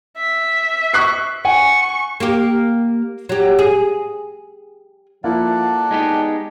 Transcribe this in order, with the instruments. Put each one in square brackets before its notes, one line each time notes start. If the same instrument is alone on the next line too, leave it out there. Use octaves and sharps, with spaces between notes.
[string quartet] E5
[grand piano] C#6 F#6 C7
[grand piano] F#5 G#5 [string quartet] C#6
[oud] A#3 G4
F#3 G4
G#4
[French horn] F3 [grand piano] A#3 E4 F4 [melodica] A4 D5 F#5
[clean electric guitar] G#3 B3 G4 [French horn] D#4